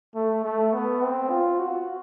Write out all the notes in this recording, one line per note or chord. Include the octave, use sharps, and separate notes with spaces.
A3
A3
B3
C4
F4
F#4